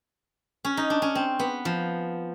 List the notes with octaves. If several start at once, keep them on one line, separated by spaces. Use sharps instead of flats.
C#4
D#4
D4
C#4
C4
B3
F3